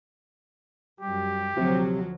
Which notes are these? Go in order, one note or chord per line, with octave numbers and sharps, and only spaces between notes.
F#2 G3 G4
D2 C3 F3 F#3